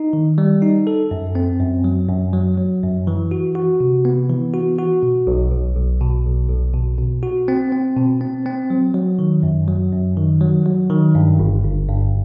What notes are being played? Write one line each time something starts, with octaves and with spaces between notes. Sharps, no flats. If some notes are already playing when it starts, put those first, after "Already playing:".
Already playing: D#4
D#3
G3
D#4
A4
F#2
C4
F#2
F#3
F#2
F#3
F#3
F#2
E3
F#4
F#4
C3
B3
E3
F#4
F#4
B2
B1
B1
B1
B2
B1
B1
B2
B2
F#4
C4
C4
B2
C4
C4
F#3
F#3
D#3
F#2
F#3
F#2
D#3
F#3
F#3
D#3
G2
G1
G1
G2